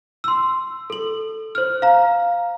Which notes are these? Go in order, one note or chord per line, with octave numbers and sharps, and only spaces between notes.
C6 E6
A4 F#7
C5 F6
F5 A#5